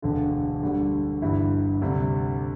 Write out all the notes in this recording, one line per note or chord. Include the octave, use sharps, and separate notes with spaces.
E1 D2 D3
D2 D3 G3
G1 G2 E3 G3 E4
D2 C3 G3